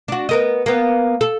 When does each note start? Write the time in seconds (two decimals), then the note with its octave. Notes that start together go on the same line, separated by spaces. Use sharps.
0.08 D4 F#4
0.29 B3 A#4 D#5
0.66 A#3 B3
1.21 A4